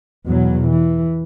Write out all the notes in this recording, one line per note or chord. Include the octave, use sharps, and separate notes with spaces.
E2 B2 F#3
E3